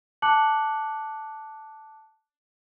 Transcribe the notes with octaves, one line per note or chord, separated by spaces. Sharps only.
A5 D6 F#6 C#7 F#7